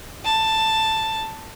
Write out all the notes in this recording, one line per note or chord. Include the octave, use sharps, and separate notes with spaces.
A5